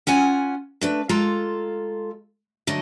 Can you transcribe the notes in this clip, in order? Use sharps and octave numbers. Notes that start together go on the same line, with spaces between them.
C#4 F4 F#5 G#5
A3 D4 B4
G#3 F4 A4 F5 A#5
D3 F#3 A3 D#5